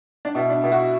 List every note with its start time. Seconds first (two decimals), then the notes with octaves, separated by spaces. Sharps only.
0.25 D4
0.35 B2 E4
0.50 D4
0.64 B2 E4
0.72 F#4
0.79 E4